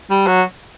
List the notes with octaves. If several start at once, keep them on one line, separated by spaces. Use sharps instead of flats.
G3
F#3